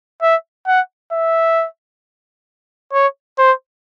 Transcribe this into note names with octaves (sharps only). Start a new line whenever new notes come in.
E5
F#5
E5
C#5
C5